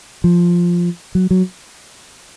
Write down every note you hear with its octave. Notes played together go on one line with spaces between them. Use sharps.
F3
F#3
F#3